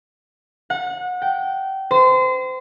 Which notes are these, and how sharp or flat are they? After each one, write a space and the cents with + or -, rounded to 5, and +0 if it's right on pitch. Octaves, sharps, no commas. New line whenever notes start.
F#5 -30
G5 -25
C5 -30